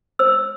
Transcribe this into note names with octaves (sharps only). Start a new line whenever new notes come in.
C5 E6